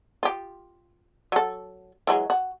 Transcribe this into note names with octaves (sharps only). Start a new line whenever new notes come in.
F4 G4
F#3 A4
E3 F#3 G#3
F#4